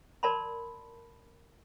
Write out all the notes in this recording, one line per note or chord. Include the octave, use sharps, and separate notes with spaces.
A#4 D5 A5 B5 C6